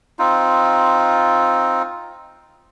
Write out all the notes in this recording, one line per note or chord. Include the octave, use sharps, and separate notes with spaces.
C4 D#4 F4